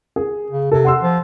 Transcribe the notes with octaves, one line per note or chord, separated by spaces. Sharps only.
G#4
C#3
C3 A4
F#5 C6 E6
F3